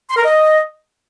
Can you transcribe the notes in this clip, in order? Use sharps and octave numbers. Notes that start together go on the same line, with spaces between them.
C6
A#4
D#5